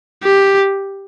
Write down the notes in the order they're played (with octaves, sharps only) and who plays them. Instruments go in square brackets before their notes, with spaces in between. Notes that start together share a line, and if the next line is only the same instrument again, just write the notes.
[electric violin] G4